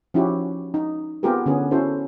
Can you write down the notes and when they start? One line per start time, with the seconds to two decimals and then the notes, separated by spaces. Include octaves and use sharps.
0.14 F3 C#4 D#4 E4 F#4 G4
0.74 D#4
1.23 B3 C4 F4 G4 G#4 A#4
1.46 D3 B3 C#4 G#4
1.71 C#4 E4 F#4 A4 C5